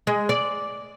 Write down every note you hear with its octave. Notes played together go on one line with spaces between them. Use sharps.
G#3
D5